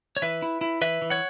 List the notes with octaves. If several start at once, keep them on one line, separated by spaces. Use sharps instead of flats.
C#5
E3 B4 E5
E4
E4
E3 B4 E5
E3
C#5 F#5